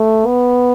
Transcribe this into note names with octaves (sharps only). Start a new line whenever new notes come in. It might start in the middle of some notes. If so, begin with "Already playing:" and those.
Already playing: A3
B3